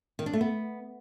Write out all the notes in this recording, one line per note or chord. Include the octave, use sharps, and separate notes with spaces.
D#3
D4
A3
B3